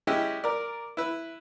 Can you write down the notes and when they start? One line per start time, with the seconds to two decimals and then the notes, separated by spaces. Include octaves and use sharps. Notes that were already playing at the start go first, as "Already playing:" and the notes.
0.07 G#3 C#4 E4 G4
0.44 A#4 D5
0.97 E4 B4